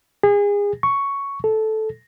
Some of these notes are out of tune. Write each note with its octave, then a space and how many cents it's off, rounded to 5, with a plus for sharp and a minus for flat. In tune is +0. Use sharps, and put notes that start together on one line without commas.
G#4 -30
C#6 +5
A4 -10